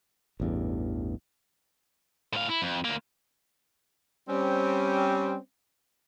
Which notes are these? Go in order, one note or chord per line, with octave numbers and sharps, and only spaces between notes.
A1 E2 G2
A2 F5
E4
F2
D2 A#3
G3 C4 C#4